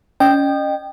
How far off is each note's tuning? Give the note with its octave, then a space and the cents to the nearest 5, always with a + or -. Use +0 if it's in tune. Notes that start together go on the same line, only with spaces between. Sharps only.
C#4 +20 D#5 -30 G5 +0